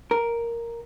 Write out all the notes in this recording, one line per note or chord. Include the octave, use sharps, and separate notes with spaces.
A#4